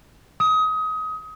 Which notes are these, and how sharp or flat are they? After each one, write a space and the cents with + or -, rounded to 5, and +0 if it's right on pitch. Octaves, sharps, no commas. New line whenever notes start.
D#6 +25